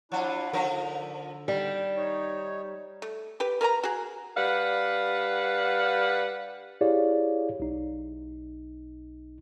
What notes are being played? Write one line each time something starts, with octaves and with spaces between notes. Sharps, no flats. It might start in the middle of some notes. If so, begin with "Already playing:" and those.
F3 D4 E4 F4 F#5
D3 F3 D#4 A#4
D#3 G3
D#4 C#5
A3
G4 B4
A#4 B4 G#5 A#5
F#4 G#4
G3 D4 B4 F5 F#5
E4 G4 G#4 C#5 D5 F5
B1 D#4